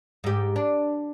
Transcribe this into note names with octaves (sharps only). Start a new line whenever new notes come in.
G#2 G4
D4